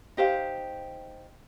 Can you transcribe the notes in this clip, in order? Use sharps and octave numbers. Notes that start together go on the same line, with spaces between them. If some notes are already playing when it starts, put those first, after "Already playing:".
D#4 G4 C5 F5